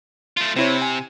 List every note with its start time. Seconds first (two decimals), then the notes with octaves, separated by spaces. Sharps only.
0.37 A3 F4
0.56 C3 C4 E4 C#5
0.82 G#5